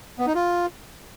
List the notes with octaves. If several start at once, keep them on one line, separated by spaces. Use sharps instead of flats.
B3
D#4
F4